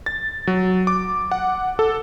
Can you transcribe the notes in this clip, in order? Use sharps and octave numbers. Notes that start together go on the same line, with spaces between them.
A6
F#3
D6
F#5
A4